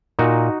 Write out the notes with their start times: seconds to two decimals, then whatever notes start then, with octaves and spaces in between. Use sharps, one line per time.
0.19 A#2 D#4 F#4